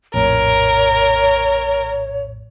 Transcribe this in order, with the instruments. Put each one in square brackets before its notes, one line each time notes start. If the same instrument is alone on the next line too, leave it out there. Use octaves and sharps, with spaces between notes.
[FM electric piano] A#1 F2 A2 [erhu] A#4 [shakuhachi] C#5